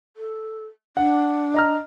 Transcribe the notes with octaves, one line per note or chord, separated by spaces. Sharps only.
A4
D4 F#5
D#5 A#5 F6